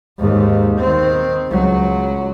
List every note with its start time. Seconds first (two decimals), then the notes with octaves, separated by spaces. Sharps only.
0.19 D#2 G#2
0.80 D#3 C4
1.47 C#2 F#3